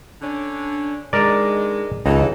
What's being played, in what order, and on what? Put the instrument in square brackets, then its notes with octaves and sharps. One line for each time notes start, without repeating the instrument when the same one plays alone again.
[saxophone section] D3 C#4 D4
[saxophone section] D3 D#3 G#3 [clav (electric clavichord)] A#4 D5
[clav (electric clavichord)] C#2 [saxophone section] E3 D#4 A4